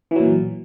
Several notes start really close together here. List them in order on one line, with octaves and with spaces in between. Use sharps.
E3 F#3 A#2